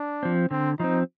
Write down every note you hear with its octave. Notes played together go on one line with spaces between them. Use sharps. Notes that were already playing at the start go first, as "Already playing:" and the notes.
Already playing: D4
F3 C4
D3 C4
F3 C4 D#4